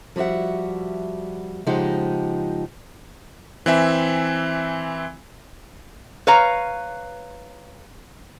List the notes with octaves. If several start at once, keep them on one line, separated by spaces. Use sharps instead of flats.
F3 G3 F#4 E5 F#5
C#3 F3 G#3 D#4 G4 F#5
E3 C4 E5 G#5
B4 C#5 F5 A#5